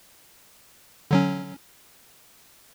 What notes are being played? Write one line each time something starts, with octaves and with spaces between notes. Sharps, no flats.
D3 F#3 C#4